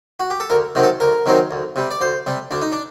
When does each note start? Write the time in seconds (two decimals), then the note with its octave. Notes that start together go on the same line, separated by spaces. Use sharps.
0.20 F#4
0.30 G4
0.40 A4
0.50 D2 A#4
0.75 C3 D#3 F#3 C4
0.83 A4
1.00 D2 A#4
1.26 C3 D#3 F#3 C4
1.51 D2
1.76 C3 G3
1.91 D5
2.01 D2 C5
2.26 C3 G3
2.51 D2 D4
2.62 D#4
2.72 D4